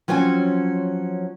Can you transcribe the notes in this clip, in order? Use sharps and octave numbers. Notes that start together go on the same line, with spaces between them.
F3 F#3 C4 C#4 F4 G#5